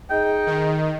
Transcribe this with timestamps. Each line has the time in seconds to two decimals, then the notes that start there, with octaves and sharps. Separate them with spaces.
0.10 D#4 G#4 G5
0.47 D#3